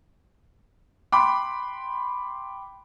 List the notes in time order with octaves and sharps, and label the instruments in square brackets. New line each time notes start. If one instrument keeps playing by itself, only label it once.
[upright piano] G5 B5 C6 D6